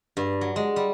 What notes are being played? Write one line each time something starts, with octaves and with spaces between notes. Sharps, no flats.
G2
F#3
G#3
G3